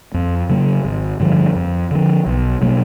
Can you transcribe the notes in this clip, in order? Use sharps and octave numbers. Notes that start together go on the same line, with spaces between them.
F2
C#3 F#3 A#3
G#1
G2 D3 F3
F2
D3 F3
B1
B2 F#3 A#3